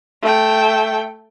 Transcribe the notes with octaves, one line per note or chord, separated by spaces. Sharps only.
A3 G5